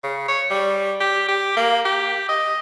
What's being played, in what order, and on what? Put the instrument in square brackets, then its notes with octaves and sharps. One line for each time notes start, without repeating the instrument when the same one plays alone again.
[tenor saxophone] C#3
C#5
G3
G4
G4
A#3
G4
D#5